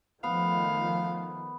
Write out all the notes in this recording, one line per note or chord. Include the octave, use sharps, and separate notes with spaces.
D#3 F3 A3 B3 F5